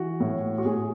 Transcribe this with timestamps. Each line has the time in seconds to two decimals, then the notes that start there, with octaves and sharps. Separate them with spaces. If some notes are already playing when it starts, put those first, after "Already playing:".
Already playing: E3 F#4
0.20 A2
0.58 F#4
0.65 A2 G#4